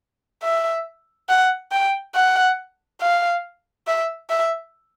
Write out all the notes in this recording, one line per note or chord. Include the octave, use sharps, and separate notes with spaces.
E5
F#5
G5
F#5
F5
E5
E5